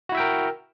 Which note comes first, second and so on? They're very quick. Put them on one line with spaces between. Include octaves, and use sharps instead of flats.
F#4 E4 E5 G5 A#4